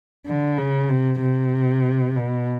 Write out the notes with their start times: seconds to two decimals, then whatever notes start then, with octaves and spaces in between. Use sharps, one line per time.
0.26 D3
0.58 C#3
0.90 C3
1.21 C3
2.17 B2